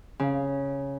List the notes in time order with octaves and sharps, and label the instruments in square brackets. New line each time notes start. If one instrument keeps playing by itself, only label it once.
[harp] C#3